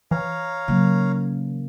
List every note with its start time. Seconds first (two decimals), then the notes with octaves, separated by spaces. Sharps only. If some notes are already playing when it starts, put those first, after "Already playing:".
0.11 E3 C#5 F5 A#5
0.68 C#3 F#3 A#3